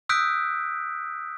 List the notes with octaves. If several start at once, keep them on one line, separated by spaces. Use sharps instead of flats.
D#6 E6 F#6 G6 B6 D7